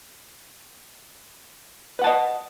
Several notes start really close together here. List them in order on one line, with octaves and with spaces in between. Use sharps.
B4 F#5 A5 D#5